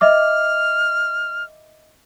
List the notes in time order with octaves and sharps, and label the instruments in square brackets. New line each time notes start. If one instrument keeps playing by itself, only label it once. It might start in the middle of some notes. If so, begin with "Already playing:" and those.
[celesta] D#5 E5 D6 [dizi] F6